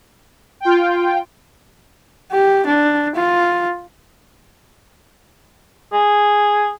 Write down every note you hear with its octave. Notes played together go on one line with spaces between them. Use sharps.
F4 G5
G4
D4
F4
G#4